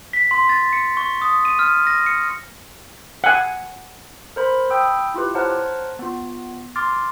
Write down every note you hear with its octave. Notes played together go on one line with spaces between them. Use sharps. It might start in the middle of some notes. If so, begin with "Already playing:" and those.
B6
C6
A6
C#7
C#6
D#6
D#7
F6
A#6
C#7
F#5 G#5
A#4 C5 B5
G5 B5 D#6 E6 G6
E4 F4 G4 B4
C5 C#5 F#5 A5 A#5 F6
B3 F4
C6 D6 F6 A6